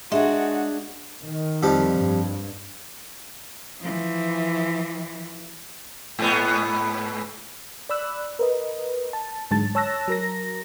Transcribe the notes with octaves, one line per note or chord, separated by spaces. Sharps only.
G#3 D4 F#4 G#4 D#5 E5
D#3
F2 F3 G3
G2
E3 F3
G#2 B3
D5 B5 E6 F#6
A#4 B4 D#5
A5
G#2 D3 F#3 G#3 A5 A6
C#5 A5 E6 F#6 A#6
F#3 A#4 A#6